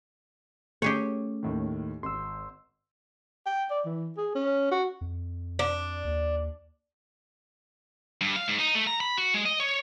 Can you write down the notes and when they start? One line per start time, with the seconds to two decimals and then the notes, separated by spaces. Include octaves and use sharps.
0.82 A3 C#4 G4 G#4 C#5
1.43 D#2 A2 D#3
2.03 G#1 C6 E6
3.46 G5
3.71 D5
3.85 E3
4.17 G#4
4.35 C#4
4.71 F#4
5.01 F2
5.59 D4
6.05 D#2
8.21 G2
8.36 F5
8.48 G#2
8.60 D#4
8.75 A3
8.87 A#5
9.00 B5
9.18 F#4
9.34 G#3
9.46 D#5
9.60 C#5